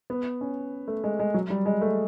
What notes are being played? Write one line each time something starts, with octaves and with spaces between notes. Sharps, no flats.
B3
C#4
A3
G#3
G#3
F#3
G3
G#3
A3